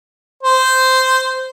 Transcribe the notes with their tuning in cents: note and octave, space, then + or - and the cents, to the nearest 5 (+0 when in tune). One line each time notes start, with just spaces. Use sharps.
C5 -10